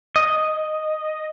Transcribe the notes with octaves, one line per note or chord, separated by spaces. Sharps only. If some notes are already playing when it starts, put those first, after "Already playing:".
D#5